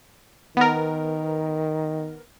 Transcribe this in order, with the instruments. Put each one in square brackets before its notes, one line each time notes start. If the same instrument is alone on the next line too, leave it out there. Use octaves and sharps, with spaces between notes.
[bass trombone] D#3 [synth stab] B3 A#4